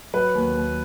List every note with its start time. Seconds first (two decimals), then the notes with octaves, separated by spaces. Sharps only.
0.14 F#3 B4
0.35 D#2
0.57 D#2